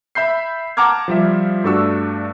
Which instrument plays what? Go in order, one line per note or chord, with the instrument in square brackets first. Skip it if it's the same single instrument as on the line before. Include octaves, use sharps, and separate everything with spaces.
[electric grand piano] E5 B5 G6 C7
F#5 A5 A#5 D6 F6 G#6
F3 G3 E5
G2 A3 D4 F#4 C#6 E6